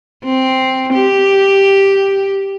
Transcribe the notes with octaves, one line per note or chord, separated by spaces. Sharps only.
C4
G4